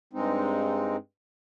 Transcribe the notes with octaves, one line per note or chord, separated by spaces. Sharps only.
G2 G#3 C4 D#4